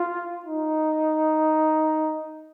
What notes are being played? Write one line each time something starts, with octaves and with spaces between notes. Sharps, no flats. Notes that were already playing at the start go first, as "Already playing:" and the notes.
Already playing: F4
D#4